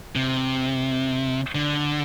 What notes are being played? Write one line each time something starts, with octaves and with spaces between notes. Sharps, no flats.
C3
D3